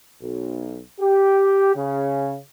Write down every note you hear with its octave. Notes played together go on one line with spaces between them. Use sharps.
B1
G4
C#3